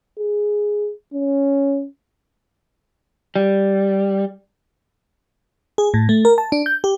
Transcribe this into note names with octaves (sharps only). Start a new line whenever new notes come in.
G#4
C#4
G3
G#4
A2
A3
A#4
A5
D4
G6
G4